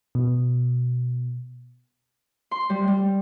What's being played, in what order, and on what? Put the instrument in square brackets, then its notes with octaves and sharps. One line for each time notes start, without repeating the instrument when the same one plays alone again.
[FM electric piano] B2
[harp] C6
G3
G3